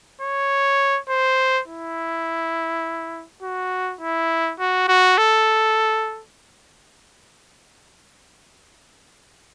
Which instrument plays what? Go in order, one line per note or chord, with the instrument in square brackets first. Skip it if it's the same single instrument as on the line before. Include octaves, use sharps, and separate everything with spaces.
[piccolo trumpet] C#5
C5
E4
F#4
E4
F#4
F#4
A4